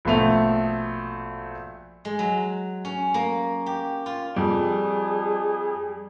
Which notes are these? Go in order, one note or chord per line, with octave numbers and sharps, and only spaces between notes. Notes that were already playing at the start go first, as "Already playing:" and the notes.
A#1 B2 A3 F7
G#3
F#3
C#4
A#3
G4
F4
F2 G3 G#4